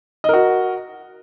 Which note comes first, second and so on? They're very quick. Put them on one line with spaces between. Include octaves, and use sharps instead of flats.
D#5 A#4 F#4